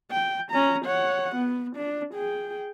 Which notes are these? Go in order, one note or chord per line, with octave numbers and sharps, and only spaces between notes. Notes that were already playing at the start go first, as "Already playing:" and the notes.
G5
C#4 A#5
C#5 F#5
B3
D4
G#4 G5